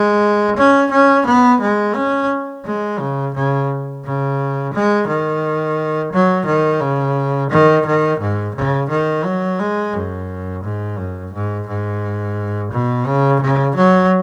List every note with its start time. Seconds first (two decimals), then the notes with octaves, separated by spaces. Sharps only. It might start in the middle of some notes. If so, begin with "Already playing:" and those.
Already playing: G#3
0.57 C#4
0.91 C#4
1.26 B3
1.60 G#3
1.95 C#4
2.65 G#3
2.99 C#3
3.35 C#3
4.04 C#3
4.74 G#3
5.07 D#3
6.13 F#3
6.46 D#3
6.81 C#3
7.51 D#3
7.86 D#3
8.20 G#2
8.55 C#3
8.90 D#3
9.24 F#3
9.59 G#3
9.93 F#2
10.64 G#2
10.98 F#2
11.33 G#2
11.67 G#2
12.72 B2
13.07 C#3
13.40 C#3
13.75 F#3